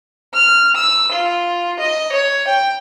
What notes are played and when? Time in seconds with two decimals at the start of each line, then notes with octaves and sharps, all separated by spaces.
0.34 F6
0.75 E6
1.12 F4
1.80 D#5
2.13 C#5
2.48 G5